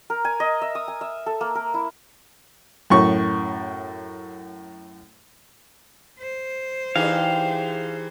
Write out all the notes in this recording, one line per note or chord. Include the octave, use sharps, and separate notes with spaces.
A#4
G#5
D#5
E5
D#6
G#5
E5
A4
A#3
A#4
E4
F#2 A2 C#6
C5
E3 D4 D#4 G4 G#4 F5